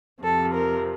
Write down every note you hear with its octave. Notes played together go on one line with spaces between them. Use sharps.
F2 C3 F3 A4
A#4